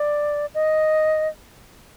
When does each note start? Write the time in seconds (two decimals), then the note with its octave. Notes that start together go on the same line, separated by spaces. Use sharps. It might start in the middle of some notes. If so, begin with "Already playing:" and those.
Already playing: D5
0.54 D#5